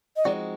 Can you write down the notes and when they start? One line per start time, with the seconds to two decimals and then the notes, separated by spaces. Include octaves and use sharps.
0.16 D#5
0.25 F3 G#3 C4 D#4 F#4 D5